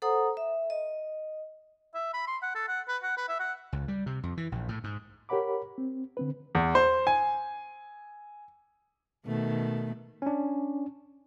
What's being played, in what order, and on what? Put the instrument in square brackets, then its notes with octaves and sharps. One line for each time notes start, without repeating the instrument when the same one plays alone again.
[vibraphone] A4 C5 F#5 A#5 D#6
E5
D#5
[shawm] E5
B5
C6
F#5
A4
F#5
B4
F#5
B4
E5
F#5
[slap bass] C#2
G3
C3
F2
E3
A#1
A2
G#2
[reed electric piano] G4 A#4 C#5 F#5 B5 D6
C4
D3 C4 B4
[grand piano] E2
C5
G#5
[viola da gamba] B2 D#3 A3
[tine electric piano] C#4 D4